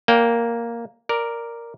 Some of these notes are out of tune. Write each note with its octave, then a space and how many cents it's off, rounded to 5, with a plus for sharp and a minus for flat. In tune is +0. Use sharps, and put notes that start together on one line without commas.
A#3 +0 D5 -25 G5 +0
A#4 +0 D5 +0